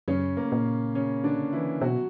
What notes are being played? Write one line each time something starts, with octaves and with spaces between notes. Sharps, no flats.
F#2 C#3 C#4
A#3
A#2
C#3 C#4
D3 D4
E3 E4
B2 F#3 F#4